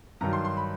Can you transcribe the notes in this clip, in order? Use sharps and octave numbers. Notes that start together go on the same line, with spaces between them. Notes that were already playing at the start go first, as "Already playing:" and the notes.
G2 D#3 F#3 A#5
C6
C6
B5